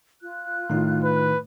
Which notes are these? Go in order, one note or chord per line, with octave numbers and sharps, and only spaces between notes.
F4 F#6
A2 D#3 D#4
B4